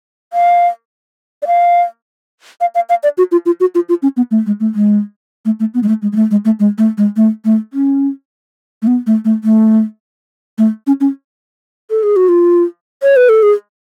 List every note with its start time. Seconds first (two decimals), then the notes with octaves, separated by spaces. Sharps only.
0.33 F5
1.42 D5
1.47 F5
2.61 F5
2.75 F5
2.89 F5
3.03 D5
3.18 F#4
3.32 F4
3.46 F4
3.60 F#4
3.75 F4
3.89 F4
4.03 C#4
4.17 B3
4.31 A3
4.46 G#3
4.60 A3
4.75 G#3
5.45 A3
5.60 A3
5.74 B3
5.83 G#3
5.88 A3
6.02 G#3
6.12 G#3
6.16 A3
6.31 G#3
6.45 A3
6.60 G#3
6.78 A3
6.98 G#3
7.16 A3
7.45 A3
7.73 C#4
8.82 A3
8.87 B3
9.07 A3
9.25 A3
9.44 A3
10.58 A3
10.87 C#4
11.01 C#4
11.90 A4
12.03 G#4
12.16 F#4
12.29 F4
13.03 C#5
13.16 B4
13.29 A4
13.43 G#4